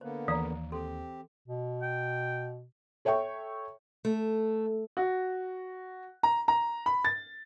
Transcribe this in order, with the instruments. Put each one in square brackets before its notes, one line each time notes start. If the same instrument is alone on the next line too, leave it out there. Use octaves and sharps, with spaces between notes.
[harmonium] D3 A#3 B3 [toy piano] C5
[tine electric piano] D#2 [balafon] E3 [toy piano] D5 F5 A#5
[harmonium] C4 G4 [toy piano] A4 C6
[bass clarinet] B2
[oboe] G5
[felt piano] A4 C#5 E5 G5 C#6
[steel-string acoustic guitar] A3
[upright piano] F#4
A#5
A#5
B5
A6